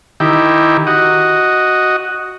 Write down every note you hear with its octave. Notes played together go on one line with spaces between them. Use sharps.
D#3 E4 G4
F#4 D#5